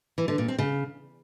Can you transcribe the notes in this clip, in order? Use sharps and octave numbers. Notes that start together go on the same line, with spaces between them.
E3
D3
A#2
C4
C#3